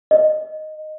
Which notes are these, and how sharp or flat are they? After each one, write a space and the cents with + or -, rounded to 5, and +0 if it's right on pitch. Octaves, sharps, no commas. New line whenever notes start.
D#5 -5